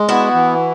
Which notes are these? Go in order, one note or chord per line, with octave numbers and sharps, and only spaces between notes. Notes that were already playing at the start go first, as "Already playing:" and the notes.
Already playing: G#3
B3 E4 F#4
E3